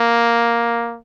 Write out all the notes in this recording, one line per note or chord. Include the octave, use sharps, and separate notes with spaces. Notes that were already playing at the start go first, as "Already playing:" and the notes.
Already playing: A#3